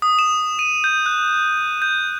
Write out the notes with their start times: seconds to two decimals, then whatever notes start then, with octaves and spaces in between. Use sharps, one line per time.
0.02 D#6
0.19 E7
0.59 D#7
0.84 G6
1.06 F#6
1.82 G6